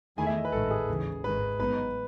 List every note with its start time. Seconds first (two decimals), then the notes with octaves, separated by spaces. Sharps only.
0.17 E2 D#3 A3 E4 G#4 G#5
0.27 E5
0.36 D#5
0.45 B4
0.52 A1 G#2 D#3 A4
0.71 G#4
0.88 D#2 C#3 E3
1.23 G#1 G#2 D#3 B4
1.59 A1 G#2 F#3 B3 D#4 B4